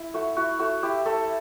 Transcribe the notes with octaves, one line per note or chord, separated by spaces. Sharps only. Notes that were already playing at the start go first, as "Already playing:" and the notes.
Already playing: E4
A3 F#4
E4 F#4
A3 F#4
E4 G4
A3 A4